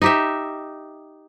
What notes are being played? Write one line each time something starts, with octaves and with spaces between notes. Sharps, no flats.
D#4 G4 E5